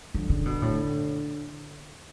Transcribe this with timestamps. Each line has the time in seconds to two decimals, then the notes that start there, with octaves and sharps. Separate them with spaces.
0.15 D3 F3
0.29 C#3
0.46 B2
0.62 A2